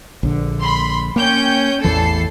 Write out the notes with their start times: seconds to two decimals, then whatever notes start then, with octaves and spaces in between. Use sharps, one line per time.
0.23 A#1 D3
0.61 B5 C6
1.16 A#3 C#4 G5 G6
1.84 A1 E2 E3 A4 C7